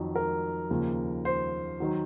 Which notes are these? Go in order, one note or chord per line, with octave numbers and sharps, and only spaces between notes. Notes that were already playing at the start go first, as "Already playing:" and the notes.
Already playing: F2 D#3 F#3
A#4
D#2 C#3 F3
C5
D#3 F#3